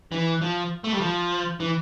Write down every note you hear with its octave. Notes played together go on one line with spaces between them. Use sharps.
E3
F3
A3
G3
F3
E3